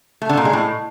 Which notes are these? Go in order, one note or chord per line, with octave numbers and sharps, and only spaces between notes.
A3
D3
A#2
G#3
A2